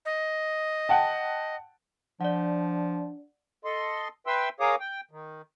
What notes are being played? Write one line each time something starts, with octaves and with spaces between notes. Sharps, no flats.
D#5
F#5 G5 A5
F3 D4 D5 F#5
A4 D#5 C6
B4 E5 G5 C6 E6
G#4 A#4 C#5 F5 D6 D#6
G5
D#3